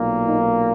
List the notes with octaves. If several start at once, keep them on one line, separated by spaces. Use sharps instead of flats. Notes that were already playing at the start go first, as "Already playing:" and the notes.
Already playing: B1 A#2 A#3
D#4